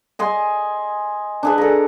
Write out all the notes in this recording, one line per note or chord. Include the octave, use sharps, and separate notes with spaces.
D#5 G#5 C6
D4 G#4 B4
A4 A#5